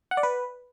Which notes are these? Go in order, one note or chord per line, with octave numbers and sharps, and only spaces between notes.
F#5
D5
B4